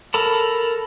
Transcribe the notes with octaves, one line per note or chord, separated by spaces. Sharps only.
A4 A#4 A5 B5